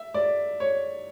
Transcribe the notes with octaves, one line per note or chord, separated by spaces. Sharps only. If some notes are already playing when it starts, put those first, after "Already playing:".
Already playing: E5
D5
C#5